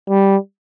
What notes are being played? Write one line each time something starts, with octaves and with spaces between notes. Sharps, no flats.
G3